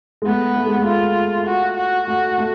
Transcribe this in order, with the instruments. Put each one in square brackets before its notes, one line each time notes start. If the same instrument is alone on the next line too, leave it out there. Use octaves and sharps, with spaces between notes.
[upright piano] G#3
[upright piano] A3 [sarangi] B3
[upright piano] A3
G#3
A3
[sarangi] F4
F#4
F#4
[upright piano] A3 [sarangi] F#4
[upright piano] A3